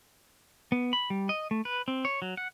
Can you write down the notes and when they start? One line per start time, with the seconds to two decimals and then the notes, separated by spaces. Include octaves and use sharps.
0.72 B3
0.93 B5
1.10 G3
1.29 D#5
1.51 A3
1.65 B4
1.88 C4
2.05 C#5
2.22 F#3
2.37 F#5